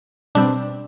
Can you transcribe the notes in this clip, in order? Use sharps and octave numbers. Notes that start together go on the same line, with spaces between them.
B2 G3 C4 D4